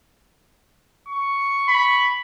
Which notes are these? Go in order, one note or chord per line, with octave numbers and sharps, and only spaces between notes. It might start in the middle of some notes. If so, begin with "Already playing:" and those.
C#6
B5